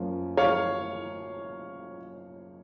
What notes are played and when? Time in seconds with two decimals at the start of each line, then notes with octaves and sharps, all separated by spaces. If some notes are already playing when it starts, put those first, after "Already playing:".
Already playing: F#2 F3 A#3 C#4
0.37 C#5 F5